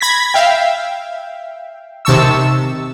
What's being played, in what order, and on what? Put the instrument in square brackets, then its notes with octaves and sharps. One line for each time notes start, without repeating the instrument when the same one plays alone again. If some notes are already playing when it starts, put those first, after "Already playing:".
[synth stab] B5 G#6 A#6 B6
E5 F5 G5
C3 D#3 A5 C#6 E6